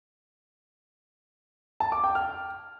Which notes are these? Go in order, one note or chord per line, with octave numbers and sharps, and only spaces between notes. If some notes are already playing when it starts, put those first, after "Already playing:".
A5
D6
G5
F6